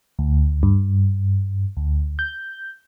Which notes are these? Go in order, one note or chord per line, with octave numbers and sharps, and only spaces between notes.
D2
G2
D2
G6